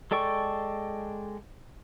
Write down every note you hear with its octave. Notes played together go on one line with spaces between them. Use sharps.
G#3 A4 D5 G5 C#6